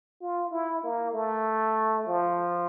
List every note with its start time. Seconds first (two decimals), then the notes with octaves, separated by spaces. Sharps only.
0.21 F4
0.51 E4
0.83 A#3
1.14 A3
2.07 F3